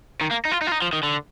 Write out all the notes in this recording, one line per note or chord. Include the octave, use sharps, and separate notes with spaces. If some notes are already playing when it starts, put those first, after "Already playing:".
D#3
A#3
D#4
F4
D#4
F4
D#4
F3
D#3
D3